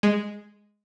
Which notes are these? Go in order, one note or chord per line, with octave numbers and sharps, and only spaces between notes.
G#3